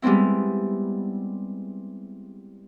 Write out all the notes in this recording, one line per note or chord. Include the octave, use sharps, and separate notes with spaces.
G3 G#3 B3 C4 E4